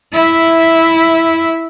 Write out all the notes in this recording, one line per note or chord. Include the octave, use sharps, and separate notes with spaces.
E4 E5